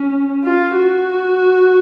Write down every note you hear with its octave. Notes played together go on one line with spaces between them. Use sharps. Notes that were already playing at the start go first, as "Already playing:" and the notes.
Already playing: C#4
F4
F#4